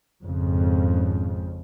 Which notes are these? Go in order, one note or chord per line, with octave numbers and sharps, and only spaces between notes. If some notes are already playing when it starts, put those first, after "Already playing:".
G#1 F2 C#3